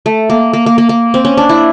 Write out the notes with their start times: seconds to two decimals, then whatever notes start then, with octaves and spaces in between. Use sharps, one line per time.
0.06 A3
0.30 A#3
0.53 A#3
0.66 A#3
0.78 A#3
0.89 A#3
1.14 C4
1.25 C#4
1.37 D4
1.49 E4